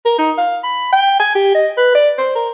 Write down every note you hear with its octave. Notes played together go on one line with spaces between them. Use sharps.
A#4
D#4
F5
B5
G5
G#5
G4
D#5
B4
D5
C5
A#4